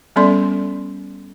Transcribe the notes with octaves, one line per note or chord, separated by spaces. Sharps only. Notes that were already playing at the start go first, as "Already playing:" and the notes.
G3 B3 C#4 A4 D5 C6